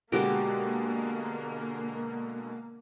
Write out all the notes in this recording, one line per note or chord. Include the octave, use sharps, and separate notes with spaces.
B2 D3 G#3 A#3 F#4 G4 A#4